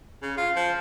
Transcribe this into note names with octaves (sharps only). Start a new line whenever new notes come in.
C#3
F4
F3